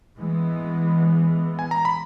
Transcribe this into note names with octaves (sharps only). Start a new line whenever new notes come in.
E3 G#3 B3
G#5
A#5
B5